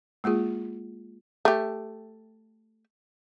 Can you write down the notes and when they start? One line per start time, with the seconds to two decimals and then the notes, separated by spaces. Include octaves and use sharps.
0.24 G#3 A#3 F4 G#4
1.45 A3 G4